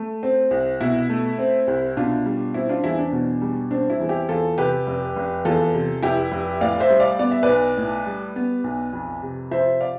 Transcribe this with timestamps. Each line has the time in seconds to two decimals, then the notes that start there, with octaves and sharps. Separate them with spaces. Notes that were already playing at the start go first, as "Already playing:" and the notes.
Already playing: A3
0.23 C4
0.51 C2
0.81 B2 E4
1.09 A3
1.38 C4
1.67 C2
1.97 B2 D4 F4
2.26 G3
2.54 C4 E4
2.69 D4 F4
2.84 E2 E4
2.99 D4
3.12 B2
3.42 G3
3.71 C4 D4
3.90 E4
4.00 E2
4.09 E4 G4
4.29 E2 F4 A4
4.58 C3 G4 B4
4.87 F1
5.16 F1
5.45 E2 F4 A4
5.74 C3
6.03 F1 E4 G4
6.32 F1
6.61 A2 D5 F5
6.72 F5
6.80 C5 E5
6.90 G3
7.00 D5 F5
7.19 B3 D5
7.31 E5
7.43 B4 D5
7.49 B1
7.77 A2
8.06 G3
8.36 B3
8.64 B1
8.93 F2
9.22 C3
9.51 F3 C5 E5
9.80 D5 F5